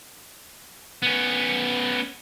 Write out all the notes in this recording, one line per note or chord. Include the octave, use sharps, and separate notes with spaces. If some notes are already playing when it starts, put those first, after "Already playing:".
B3 C#4